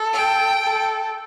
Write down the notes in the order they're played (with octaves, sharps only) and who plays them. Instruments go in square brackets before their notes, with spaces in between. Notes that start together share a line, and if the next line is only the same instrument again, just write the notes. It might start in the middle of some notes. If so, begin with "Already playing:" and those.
Already playing: [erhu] A4
[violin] G5
[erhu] A4